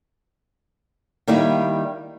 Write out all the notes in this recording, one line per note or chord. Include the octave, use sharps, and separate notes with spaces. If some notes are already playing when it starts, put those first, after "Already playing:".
D#3 G3 A#3 D#4 E4